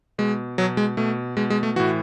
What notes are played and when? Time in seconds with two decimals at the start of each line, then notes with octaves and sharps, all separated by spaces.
0.18 B2 G#3
0.58 B2 F#3
0.77 G#3
0.97 B2 A3
1.37 B2 G#3
1.50 G#3
1.63 A3
1.76 A2 E3 F#4